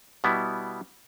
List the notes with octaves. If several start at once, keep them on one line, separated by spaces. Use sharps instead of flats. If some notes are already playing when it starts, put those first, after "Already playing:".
B2 G3 B3 E4